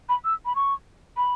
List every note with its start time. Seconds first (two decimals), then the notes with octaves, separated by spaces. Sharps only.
0.09 B5
0.25 E6
0.45 B5
0.56 C#6
1.17 B5